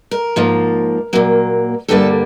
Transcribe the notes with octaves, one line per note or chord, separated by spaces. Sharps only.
A#4
G#2 F3 A#3
A#2 F#3 A#3
G2 D3 G3 A#3 A4